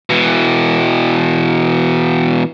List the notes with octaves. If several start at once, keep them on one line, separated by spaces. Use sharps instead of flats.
B2 E3